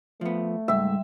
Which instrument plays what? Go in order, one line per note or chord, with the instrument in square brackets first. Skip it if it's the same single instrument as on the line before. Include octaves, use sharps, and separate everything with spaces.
[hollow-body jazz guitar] F3 B3 [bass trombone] A3
[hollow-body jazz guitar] C#2 G#2 [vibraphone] G3 [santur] E5